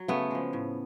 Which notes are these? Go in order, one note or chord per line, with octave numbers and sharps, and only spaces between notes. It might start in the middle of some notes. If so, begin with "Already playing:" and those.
Already playing: F#3
C#3 A3 B3
F3 G#3
A2